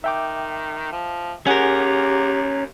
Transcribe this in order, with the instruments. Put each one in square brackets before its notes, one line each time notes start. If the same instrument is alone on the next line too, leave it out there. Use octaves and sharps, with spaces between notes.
[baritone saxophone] D#3 [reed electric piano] E5 G5 D6
[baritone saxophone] F3
[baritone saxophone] D#2 [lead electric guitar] C#4 A#4 [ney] G4 [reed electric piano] G#4 F#5 G#5